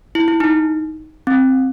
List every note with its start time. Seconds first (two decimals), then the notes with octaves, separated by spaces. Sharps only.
0.15 E4
0.28 E4
0.40 D#4
1.27 C4